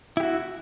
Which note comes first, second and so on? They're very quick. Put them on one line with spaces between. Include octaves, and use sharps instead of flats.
E4 G4 F#4